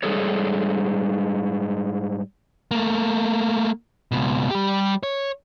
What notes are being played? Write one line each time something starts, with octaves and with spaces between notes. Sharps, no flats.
G#2 G3 G#4 A4 C#5
A3 A#3
C#2 B2
G3 G4
C#5